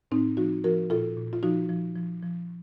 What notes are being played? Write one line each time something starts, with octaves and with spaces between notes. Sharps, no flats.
A2 C4 D#4
F3 D#4 F#4
F3 F#4 A#4
A#2 F4 A4
A#2
F4
F3 D#4 F#4
F3
F3
F3